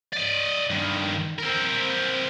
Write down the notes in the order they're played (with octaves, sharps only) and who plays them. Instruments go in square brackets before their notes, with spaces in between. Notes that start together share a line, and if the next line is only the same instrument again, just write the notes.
[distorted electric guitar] D5 D#5
G2 D#3
C4 A#4